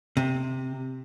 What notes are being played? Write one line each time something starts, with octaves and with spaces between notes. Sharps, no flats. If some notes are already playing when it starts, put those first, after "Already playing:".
C3